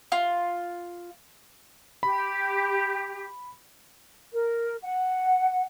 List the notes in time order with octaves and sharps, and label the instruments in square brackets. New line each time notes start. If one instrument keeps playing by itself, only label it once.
[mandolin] F4
[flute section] G4 [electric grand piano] B5
[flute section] A#4
F#5